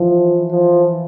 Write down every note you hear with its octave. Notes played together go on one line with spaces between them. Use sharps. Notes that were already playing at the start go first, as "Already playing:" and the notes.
Already playing: E3 F3
F3